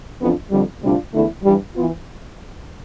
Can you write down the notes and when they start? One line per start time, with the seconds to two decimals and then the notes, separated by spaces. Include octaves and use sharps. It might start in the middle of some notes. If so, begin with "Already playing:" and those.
0.20 F2 E3 B3 D4 F4
0.51 F2 D3 G3
0.82 D2 C3 G3 D4 F4
1.13 E2 D3 A3 E4
1.44 G2 E3 G3
1.75 E3 B3 F4